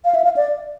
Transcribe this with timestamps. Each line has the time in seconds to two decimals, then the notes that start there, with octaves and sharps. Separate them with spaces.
0.05 F5
0.15 E5
0.25 F5
0.36 D5